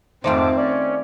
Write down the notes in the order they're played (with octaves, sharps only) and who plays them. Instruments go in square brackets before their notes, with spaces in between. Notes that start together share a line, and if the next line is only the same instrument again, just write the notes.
[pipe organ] F2 G#2 D6 [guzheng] D#3 A3 F4 [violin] C4 [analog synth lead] C5
[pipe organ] C#4 [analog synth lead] D5